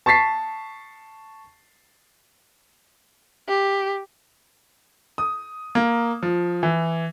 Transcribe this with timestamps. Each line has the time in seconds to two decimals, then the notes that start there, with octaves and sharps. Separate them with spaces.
0.06 A5 C#6 A6 B6 C7
3.49 G4
5.18 D#6
5.75 A#3
6.23 F3
6.63 E3